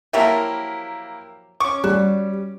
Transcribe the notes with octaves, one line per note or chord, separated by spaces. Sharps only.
F3 F#3 A#3 E4 G4 A#4 E5
C#4 C#6 D6
G3 F#4